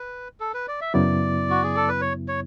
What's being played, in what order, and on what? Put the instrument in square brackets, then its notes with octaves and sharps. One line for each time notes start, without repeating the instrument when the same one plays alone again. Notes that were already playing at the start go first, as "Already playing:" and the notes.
Already playing: [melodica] B4
A4
B4
D5
E5
[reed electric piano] F#2 C#3 F#3 B3 E4 [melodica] D5
[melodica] F#4
G#4
A4
B4
C#5
C#5